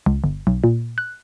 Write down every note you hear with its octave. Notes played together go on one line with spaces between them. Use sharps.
C#2
G1
B1
A#2
F#6